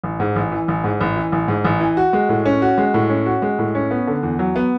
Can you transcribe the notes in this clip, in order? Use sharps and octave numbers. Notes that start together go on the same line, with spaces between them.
A1
G#2
A1
E3
A1
G#2
A1
E3
A1
G#2
A1
E3
F#4
G#3
A2
C#4
F#4
G#3
A2
C#4
F#4
G#3
A2
C#4
B3
D3
E2
F#3
B3